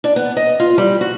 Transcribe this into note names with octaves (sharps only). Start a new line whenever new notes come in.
D4
B3
D#5
F4
G3
F#4